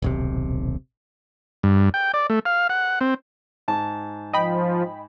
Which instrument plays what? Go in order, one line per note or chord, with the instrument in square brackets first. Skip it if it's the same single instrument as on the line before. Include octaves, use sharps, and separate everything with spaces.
[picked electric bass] D#1 B1 C3
[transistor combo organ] G2
G5
D5
A3
F5
F#5
C4
[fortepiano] G#2 A5
[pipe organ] F3 [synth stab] D#5 G5 B5